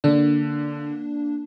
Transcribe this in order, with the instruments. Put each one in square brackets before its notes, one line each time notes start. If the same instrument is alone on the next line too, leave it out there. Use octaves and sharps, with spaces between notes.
[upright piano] D3 [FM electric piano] A#3 D4